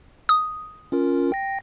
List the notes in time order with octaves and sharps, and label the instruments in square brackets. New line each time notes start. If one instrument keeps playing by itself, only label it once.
[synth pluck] D#6
[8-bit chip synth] C#4 F4 A#4
G5 A#6